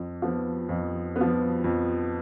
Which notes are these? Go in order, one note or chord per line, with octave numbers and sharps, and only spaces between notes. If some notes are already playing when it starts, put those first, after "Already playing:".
Already playing: F2
F3 B3
F2
B3
F3
F2